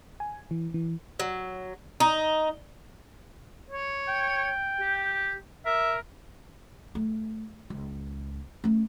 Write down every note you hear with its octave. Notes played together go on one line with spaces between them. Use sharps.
G#5
E3
E3
F#3
D#4
C#5
G5
G4
A#4 E5
A3
C#2
A3 C#4